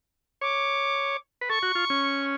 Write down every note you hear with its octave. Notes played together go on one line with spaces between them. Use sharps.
C#5 D6
B4
A4 C#6
F#4
F4
C#4